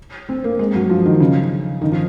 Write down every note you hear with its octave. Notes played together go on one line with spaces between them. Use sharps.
C4
A#3
G#3
F#3
F3
D#3
C#3
D#3
F3